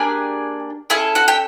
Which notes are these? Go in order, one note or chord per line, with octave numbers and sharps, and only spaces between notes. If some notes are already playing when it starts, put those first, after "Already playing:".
Already playing: A#3 D4 G4 G#4 G#5
C#4 E4 G#4 A4 G#5
F#4 F#5
G4 G5